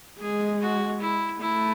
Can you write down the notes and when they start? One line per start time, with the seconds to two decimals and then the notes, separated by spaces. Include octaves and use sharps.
0.20 G#3 G#4
0.61 F#4
1.01 E4
1.41 A3 E4